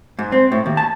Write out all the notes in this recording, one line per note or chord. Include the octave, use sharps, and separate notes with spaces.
G#2
C4
A2
D#2
A5